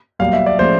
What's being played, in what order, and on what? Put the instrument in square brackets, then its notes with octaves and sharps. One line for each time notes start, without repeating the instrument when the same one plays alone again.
[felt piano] B1 A#2 G3 [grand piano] F5
[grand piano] E5
D5
[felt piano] A2 F3 G#3 C#4 [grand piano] C5